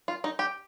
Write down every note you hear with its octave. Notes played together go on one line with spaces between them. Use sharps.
F4
D#4
G4